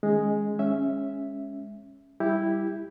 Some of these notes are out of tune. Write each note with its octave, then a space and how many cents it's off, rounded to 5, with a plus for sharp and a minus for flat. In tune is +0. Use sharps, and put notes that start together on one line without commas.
D#3 +0 G#3 +0 C#4 +0
G#3 +0 C#4 +0 E5 +0
G3 +0 E4 +0 G4 +0